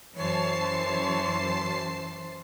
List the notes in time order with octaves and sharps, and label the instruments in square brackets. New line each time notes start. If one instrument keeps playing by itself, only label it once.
[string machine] F#2 A5 C7 [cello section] E3 C5 [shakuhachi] C#5